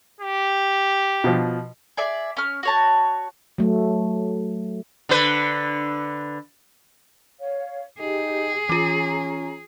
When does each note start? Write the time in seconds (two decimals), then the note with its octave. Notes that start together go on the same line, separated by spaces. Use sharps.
0.21 G4
1.24 B2 F3
1.97 G#4 D5 E5
2.37 C#4 F6
2.63 F#4 C#5 A5
3.58 F#3 A3
5.09 D3 B4
7.40 C#5 F5
8.00 D#4 G4 G#4
8.69 E3 C#4 F4 A#5